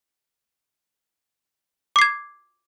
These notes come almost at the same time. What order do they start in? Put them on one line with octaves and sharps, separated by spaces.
D6 C7 G#6